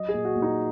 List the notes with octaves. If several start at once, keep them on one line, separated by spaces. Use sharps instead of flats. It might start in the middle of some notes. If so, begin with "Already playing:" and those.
Already playing: F#3 D#5
G#4
A#2
F#4
A#2
D#4